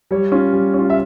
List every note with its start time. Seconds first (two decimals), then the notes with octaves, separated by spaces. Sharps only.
0.11 G3 C#5
0.32 C#4 F4
0.53 G3
0.74 C#4 F4
0.90 E5